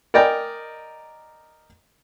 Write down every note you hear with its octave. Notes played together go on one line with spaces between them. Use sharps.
A#4 D5 D#5 G5 G#5 A#5